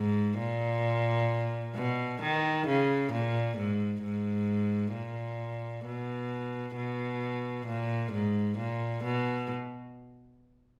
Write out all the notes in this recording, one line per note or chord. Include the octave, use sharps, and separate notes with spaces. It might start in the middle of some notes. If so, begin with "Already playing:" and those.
Already playing: G#2
A#2
B2
D#3
C#3
A#2
G#2
G#2
A#2
B2
B2
A#2
G#2
A#2
B2